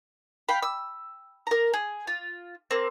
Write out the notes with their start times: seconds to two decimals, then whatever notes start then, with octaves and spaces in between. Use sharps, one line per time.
0.49 F5 G5 B5
0.63 E6
1.47 A#4 A#5
1.73 G#4
2.07 F4
2.71 A#3 C4